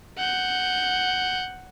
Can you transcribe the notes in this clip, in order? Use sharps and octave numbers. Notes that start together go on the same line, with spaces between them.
F#5 G6